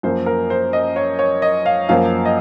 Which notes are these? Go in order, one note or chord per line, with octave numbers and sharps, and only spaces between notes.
F#2 F3 A#3 C5
A#4
C5
D#5
C#5
C#5
D#5
F5
F#2 F3 A#3 F5
D#5